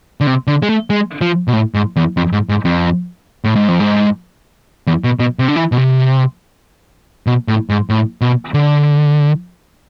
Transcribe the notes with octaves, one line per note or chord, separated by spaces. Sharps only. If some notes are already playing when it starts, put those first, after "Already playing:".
D3
C3
D3
G#3
A3
G#3
F3
B2
A2
G#2
E2
F2
G#2
G#2
F2
A2
G#2
F2
G#2
E2
B2
B2
C3
D3
E3
B2
C3
B2
A2
G#2
A2
B2
D3